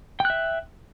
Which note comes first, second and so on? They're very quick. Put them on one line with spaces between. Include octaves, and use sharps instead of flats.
G5 F#6 E5